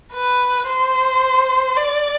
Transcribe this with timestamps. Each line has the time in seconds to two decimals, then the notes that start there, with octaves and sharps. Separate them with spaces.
0.13 B4
0.67 C5
1.77 D5